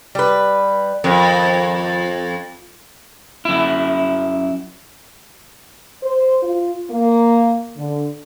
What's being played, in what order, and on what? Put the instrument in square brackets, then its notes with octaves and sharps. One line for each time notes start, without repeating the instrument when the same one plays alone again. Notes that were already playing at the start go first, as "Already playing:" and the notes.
[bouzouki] G3 B4
[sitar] F2 [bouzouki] D#3
[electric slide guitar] F#2 E4
[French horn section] C5
F4
A#3
D3